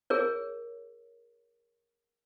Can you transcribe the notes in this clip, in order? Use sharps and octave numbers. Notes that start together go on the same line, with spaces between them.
G#4 A#4 C#5